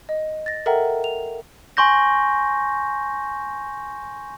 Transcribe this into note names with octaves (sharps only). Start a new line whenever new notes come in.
D#5
A6 A#6
A4 A#4 E5 F#5 G5 A#5
F7
G#5 C6 C#6 G6 A#6